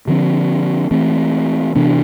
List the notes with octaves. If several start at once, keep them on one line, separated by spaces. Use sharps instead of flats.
D3 F3 C4
E3 A3 C4
C3 E3 B3 D4